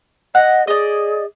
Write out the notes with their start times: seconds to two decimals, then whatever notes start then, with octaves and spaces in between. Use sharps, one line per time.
0.35 D#5 F#5
0.67 G#4 D5 D#5